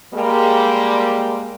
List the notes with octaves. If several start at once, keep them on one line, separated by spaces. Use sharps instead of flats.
G3 G#3 A#3